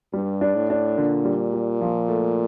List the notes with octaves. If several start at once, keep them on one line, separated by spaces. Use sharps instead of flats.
G2 G3
D4
A2
D4
A#2 D3
G3
G3
F3
A3